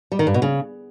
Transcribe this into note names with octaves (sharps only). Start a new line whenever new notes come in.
G3
D#3
G2
B2
C#3